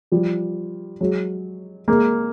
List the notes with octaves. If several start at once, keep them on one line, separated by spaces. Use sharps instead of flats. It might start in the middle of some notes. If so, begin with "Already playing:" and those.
F3 G3
F#3 G#3
G#3 A#3